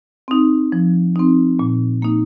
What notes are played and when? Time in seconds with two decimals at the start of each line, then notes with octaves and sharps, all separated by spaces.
0.28 C4 D#4
0.72 F3
1.16 C4 D#4
1.59 A#2
2.02 A#3 D#4